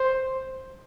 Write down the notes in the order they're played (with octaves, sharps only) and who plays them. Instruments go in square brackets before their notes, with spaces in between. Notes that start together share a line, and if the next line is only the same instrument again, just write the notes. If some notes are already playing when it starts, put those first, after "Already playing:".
Already playing: [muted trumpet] C5